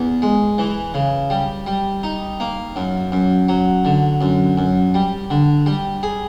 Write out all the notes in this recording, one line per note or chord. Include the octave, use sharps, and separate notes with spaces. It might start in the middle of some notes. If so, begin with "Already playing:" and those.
Already playing: E2
G#3
E3
C#3
G3
G3
D#4
A#3
F#2
F#2
F#3
D3
F#2
F#2
G3
D3
G3
G#4